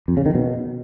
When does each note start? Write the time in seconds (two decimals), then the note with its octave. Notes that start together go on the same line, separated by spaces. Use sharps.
0.08 F2
0.17 C#3
0.26 D#3
0.35 B2